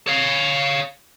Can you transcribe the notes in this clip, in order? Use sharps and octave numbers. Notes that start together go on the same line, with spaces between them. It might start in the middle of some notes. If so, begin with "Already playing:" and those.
C#5 F5